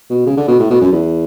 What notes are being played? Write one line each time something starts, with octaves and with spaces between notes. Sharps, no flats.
B2
C#3
D3
B2
A2
B2
F#2
E2